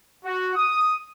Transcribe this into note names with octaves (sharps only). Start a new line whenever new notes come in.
F#4
D#6